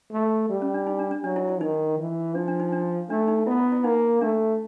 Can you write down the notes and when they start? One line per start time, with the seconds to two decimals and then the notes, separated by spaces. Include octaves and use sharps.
0.12 A3
0.49 G3
0.62 C#4
0.74 D4
0.87 D#4
0.99 D4
1.11 D4
1.24 F#3 D4
1.36 E4
1.49 E4
1.61 D#3 D#4
1.99 E3
2.35 F3 D4
2.48 D4
2.60 D#4
2.73 D4
3.10 A3 D4
3.28 D#4
3.47 B3 E4
3.59 E4
3.72 E4
3.84 A#3 D#4
4.21 A3 D4